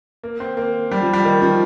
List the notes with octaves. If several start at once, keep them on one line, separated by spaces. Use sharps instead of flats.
A#3
C4
A#3
G3
F3
G3
D#3
F3